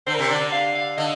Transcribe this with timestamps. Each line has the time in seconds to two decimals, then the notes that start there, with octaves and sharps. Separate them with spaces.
0.07 D3 C5
0.15 A#4
0.19 C3 C5
0.29 D3 D5
0.52 F5
0.75 F5
0.98 D3 D#5